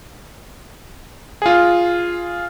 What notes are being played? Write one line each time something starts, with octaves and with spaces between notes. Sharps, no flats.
F4 G#4